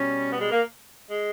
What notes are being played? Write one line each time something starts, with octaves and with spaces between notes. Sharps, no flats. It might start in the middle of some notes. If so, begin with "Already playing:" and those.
Already playing: B2 G3 C#4
B3
G#3
A#3
G#3